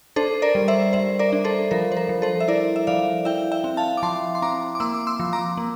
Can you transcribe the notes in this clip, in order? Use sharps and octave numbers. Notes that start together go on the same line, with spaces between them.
D4 A4 C5
A#4 D5
G3
C5 E5
G3 C5 E5
A#4 D5
D4
A4 C5
F3 A#4
C5
A#4
F3
A4 C5
E5
E4 A#4 D5
E5
F3 D5 F5
E4 E5 G5
E5 G5
C4
F5 A5
D6
F3 A5 C6
C6
C4 A#5 D6
D6
A#3 C6 E6
D6
C6 E6
F3
A#5 D6
A#3